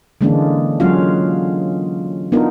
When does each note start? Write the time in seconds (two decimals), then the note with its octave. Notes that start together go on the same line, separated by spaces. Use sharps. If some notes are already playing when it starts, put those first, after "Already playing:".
0.21 D3 E3 G#3 A#3 C#4 D4
0.80 F#3 G#3 C#4 F4 F#4 F5
2.32 B3 D4 D#4 F4 F#4 A#4